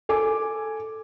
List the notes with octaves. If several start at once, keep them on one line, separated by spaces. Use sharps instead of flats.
A4 G#5 D6